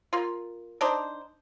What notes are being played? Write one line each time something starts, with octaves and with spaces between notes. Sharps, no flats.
A#3 F4
D4 D#4 C5